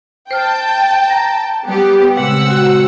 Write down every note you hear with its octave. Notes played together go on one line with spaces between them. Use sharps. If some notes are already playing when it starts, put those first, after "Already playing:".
C5 G5 A5 F6
A#5 A#6
G3 B3 G4
A#2 C#3 G#3 C4 F#5 E6
F#4